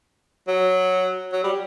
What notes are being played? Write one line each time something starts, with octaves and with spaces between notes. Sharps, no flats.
F#3
F#3
G3